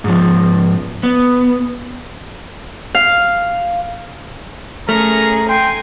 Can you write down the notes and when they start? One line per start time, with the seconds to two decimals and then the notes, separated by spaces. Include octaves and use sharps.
0.04 G#2 F3
1.03 B3
2.95 F5
4.89 A3 C#4 G#4 A#4 A#5
5.49 G5 G#5 C6